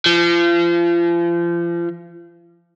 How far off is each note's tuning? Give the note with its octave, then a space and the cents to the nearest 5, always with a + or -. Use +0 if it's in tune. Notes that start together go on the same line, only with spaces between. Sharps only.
F3 -35